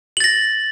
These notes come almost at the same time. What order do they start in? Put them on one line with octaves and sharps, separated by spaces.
F#7 A6 A#6